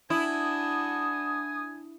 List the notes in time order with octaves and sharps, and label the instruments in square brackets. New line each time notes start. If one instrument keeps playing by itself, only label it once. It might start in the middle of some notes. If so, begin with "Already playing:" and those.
[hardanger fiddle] D4 F#4 [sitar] E4 [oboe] G#5 [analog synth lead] D#6